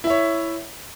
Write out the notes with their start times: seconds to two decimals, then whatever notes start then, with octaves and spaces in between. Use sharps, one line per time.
0.04 E4
0.07 E5
0.10 C#5